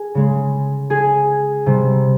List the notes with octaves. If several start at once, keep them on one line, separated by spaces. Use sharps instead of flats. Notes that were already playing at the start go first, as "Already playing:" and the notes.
Already playing: G#4
C#3 G#3
G#4
C3 G3